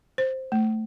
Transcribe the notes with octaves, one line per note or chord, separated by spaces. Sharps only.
C5
A3